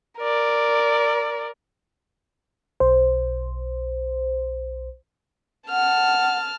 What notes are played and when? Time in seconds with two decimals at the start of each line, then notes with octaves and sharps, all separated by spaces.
0.20 A#4 D5
2.80 B1 C5
5.70 F#5 A5 F6